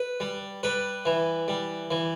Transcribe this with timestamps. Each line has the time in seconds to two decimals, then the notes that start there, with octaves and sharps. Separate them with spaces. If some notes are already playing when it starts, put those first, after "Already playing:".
Already playing: B4
0.20 G3
0.63 G3 B4
1.05 E3
1.48 G3
1.91 E3